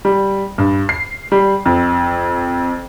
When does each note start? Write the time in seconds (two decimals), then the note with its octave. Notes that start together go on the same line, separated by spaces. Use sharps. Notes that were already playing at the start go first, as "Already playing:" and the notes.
0.05 G3
0.58 G2
0.89 C7
1.32 G3
1.66 F2